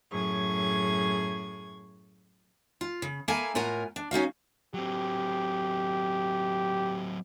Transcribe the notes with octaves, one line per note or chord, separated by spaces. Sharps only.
F#2 A2 G#4 C#6 G#6
F4
C#3
A#3 E4 A4 F5 G#5 A#5
A2 F4 A#4 F#5 G#5 A#5
D4
C#4 D#4 F#4 F5
F#3 C4 G4